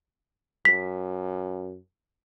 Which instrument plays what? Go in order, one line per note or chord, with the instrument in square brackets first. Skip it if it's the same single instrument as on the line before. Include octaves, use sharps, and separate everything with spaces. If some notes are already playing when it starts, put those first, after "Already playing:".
[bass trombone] F#2 [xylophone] B6